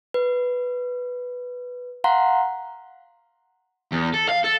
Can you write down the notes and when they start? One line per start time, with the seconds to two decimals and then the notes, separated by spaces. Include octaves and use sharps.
0.14 B4
2.04 F5 F#5 A#5 C6
3.92 E2
4.14 A4
4.29 F5
4.44 A4